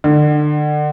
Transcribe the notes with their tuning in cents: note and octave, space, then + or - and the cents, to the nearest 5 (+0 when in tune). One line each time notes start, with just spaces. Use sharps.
D3 +30